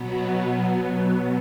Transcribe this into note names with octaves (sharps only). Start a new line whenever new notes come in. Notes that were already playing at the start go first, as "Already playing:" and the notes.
Already playing: B2 F#3 B3